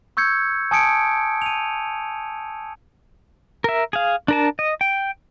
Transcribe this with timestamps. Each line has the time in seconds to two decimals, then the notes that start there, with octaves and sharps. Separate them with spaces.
0.17 C#6 E6 G6 G#6 C#7
0.71 G#5 A5 D#6 G#6 C#7 D7
1.42 D#7 F7
3.64 A#4 E5
3.93 G#4 F5
4.28 D4 A#4 A5
4.59 D#5
4.81 G5